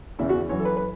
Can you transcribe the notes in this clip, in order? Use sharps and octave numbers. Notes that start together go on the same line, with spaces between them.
E2 C#3 E3 E4
F#4
F#2 E3 C#5
A4
B4
B4